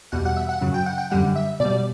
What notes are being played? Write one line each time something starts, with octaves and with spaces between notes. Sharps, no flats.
E2 B2 G3 F#5
F#5
E5
F#5
F#2 C#3 F#3
G5
F#5
G5
F#2 D3 G3 F#5
E5
B2 G3 D5